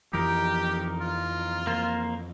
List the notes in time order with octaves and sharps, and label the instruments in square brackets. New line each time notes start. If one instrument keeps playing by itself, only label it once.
[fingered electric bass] F2 E3 F3 [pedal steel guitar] D#4 A#4 [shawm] G4
[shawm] F4
[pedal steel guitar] A#3 C5